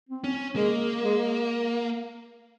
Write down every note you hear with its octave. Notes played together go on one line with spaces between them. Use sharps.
C4
C#4
G#3 A#3
G#3